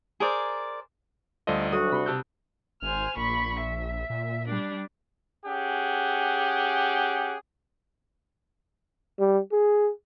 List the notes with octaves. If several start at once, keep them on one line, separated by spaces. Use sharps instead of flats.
G#4 A#4 C5 D5
D2 G3 F4 A4 C5 D5 D#5
D#4
D2 F#3 F#4 D#6
C3 B5 C6
C3 G4 A5 E6 F#6 G6
G#1 C5 G#5 F6
A#1 A#2 B5 C#6
E5
A#2
G3 D4
C#4 G4 G#4 F#5
G3
G#4